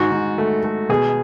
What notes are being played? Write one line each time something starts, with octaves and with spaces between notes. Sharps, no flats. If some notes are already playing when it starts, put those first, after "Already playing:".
Already playing: G#2 F#4
G#2
A3
A3
B2 G#4